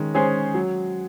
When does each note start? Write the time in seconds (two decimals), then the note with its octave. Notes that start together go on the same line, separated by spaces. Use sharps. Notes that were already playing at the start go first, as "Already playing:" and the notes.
Already playing: D#3 G#3 C#4
0.14 G#3 C#4 G#4 C5
0.54 F#3